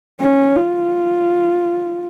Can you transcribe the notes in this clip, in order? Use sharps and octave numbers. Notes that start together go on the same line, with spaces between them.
C#4
F4